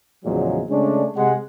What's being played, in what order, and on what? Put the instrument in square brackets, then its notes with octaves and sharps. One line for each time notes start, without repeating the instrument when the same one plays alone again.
[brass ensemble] E2 A#2 C#3 F3 F#3 G#3
C#3 G#3 A3 C#4 D4
C3 G#3 F#5